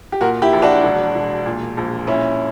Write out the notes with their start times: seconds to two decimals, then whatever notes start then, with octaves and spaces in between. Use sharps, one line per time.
0.12 G4
0.21 A#2 F#4 A#4
0.42 E4 G4
0.53 A#1
0.62 D4 F#4
0.83 E1
1.15 E1
1.46 A#2
1.77 A#1
2.07 A#2 C#4 E4